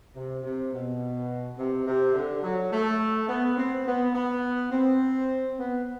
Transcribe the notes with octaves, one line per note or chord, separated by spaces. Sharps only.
C3
C3
B2
C3
C3
D3
F#3
A3
B3
C4
B3
B3
C4
B3